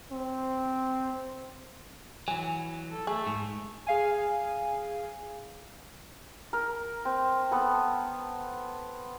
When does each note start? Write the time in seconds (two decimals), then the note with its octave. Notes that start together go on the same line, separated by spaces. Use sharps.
0.12 C4
2.28 E3 F#3 G#5
2.91 A4
3.07 A3 G#4
3.27 G#2
3.87 G#4 F5 G#5
6.53 A#4
7.05 C4
7.51 B3 A4